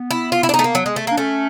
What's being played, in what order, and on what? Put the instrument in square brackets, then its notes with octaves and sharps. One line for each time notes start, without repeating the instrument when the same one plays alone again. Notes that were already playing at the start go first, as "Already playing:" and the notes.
Already playing: [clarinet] B3
[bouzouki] E4
F4
E4
D4
D#4
A3
A#3
F#3
G#3
A3
[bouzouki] A#3 [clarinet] D4
[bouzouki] A3 [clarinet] C#4